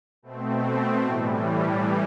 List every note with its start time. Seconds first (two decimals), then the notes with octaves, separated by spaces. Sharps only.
0.23 B2 A3 C4
1.04 A2 E3 G3